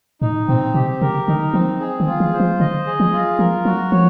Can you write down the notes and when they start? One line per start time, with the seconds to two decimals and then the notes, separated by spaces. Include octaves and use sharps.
0.22 A2 D#4
0.48 A#2 C4
0.74 C3 G4
1.01 C#3 A#4
1.27 D3 D#4
1.54 F3 C4
1.80 G#4
2.00 D#3
2.07 F4
2.20 E3
2.33 C5
2.40 F3
2.60 D3 D#5
2.86 G#4
3.00 F3
3.12 F4
3.39 F3 A#4
3.65 F#3 F#4
3.92 F3 C#5